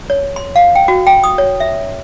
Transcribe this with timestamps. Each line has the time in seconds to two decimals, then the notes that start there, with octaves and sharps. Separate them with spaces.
0.10 C#5
0.36 C6
0.56 F5
0.75 G5
0.88 F#4
1.07 G5
1.24 D#6
1.38 C#5
1.60 E5